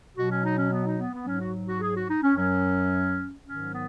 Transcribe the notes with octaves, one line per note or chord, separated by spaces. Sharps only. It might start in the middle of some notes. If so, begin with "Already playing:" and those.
B2 F#3 F#4
C#4
D#4
C#4
B3
D#4
B3
B3
G#2 F#3 C#4
F#4
F#4
G#4
F#4
D#4
C#4
F#2 F#3 C#4
G#2 D#3 F#3 C#4
B3